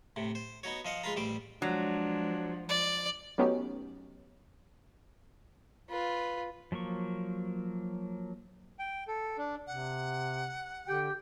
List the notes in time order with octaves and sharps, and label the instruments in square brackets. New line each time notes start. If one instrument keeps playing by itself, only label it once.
[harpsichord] A2 C3
C5
B3 D#4 F#4 C#5
F3 D#5 F5 F#5
G#3 F4 B4 F5 A#5
A1 G3 C5 D6
[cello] F3 G#3 [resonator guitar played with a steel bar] F#3 [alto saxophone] D4
[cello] F3 [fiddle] D5
[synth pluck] F#3 A3 B3 C#4 D#4 G4
[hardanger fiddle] F4 B4
[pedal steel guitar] F3 F#3 A#3 C#6
[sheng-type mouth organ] G5
A4
D4
[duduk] C3 [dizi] F#5
[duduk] D3 [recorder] G4 [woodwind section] G5